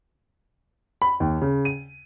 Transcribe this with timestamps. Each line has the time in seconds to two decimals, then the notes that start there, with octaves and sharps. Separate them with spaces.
1.02 B5
1.20 D#2
1.42 C#3
1.65 D#7